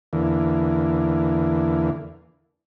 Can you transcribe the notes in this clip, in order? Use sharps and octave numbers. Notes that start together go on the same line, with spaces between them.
E2 D3 E3 A#3